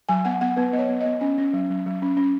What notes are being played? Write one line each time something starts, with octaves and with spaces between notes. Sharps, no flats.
F#3 G#5
B3 F#5
B3 F#5
B3 B4
B3 D#5
C#5
B3
D#5
B3
C#4 G#5
C#4
F#3
F#3
F#3
C#4
C#4